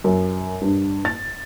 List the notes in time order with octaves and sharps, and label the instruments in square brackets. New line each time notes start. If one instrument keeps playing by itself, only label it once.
[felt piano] F#2
G2
A6